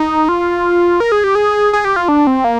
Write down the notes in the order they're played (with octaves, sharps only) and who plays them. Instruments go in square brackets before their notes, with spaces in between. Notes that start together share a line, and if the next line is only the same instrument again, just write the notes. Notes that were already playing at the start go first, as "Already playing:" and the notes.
Already playing: [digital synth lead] D#4
F4
A#4
G#4
G4
G#4
G#4
G4
F4
D4
C4
A#3